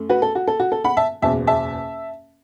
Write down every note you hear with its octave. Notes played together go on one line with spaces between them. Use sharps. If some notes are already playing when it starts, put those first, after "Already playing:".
Already playing: F#2 A3
F#4 B4
A4
F#4
A4
F#4
A4
F#5 B5
E5 A5
F#1 E2 B2 E5 A5
E5 A5